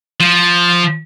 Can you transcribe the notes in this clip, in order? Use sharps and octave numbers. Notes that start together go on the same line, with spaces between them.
F3